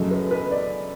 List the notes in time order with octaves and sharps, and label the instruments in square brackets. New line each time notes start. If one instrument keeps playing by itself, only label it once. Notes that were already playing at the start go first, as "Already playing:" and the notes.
Already playing: [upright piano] F#2 C#3 F#3 A3 D#5
B4
B4
D5